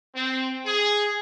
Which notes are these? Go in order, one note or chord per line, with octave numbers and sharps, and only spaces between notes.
C4
G#4